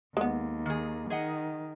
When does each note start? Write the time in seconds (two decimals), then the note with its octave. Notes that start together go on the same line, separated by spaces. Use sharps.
0.17 D#2 G#3 B3
0.66 D#3 G#4
1.10 D#3 G#4 D#5 F#5